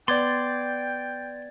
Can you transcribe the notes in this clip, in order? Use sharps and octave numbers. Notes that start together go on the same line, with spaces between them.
B3 D5 G5 C6 D6 G#6 A6